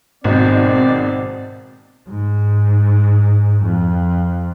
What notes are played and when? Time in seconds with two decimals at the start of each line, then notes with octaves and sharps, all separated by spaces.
0.24 G#1 G#2 B2 D#3 C4 C5 D5
2.09 G#2
3.63 F2